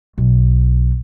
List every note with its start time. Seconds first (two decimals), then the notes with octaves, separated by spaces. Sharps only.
0.18 B1